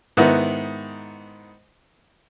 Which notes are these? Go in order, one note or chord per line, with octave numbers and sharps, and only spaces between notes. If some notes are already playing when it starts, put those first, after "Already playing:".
G#2 D#3 B3 E4 F#5